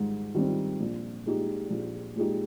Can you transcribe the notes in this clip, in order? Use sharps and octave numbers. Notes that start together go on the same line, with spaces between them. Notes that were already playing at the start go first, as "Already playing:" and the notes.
Already playing: G#2 D#3 G3
D#3 G3 C4
A#1
A#2 G#3 D#4 G4
A#1
A#2 G#3 D#4 G4